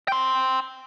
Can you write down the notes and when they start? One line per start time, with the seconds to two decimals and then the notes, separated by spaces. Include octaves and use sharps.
0.08 G5 C6